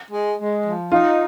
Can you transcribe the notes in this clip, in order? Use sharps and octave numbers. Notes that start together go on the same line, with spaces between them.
G#3
G#3
F3
D#4 F4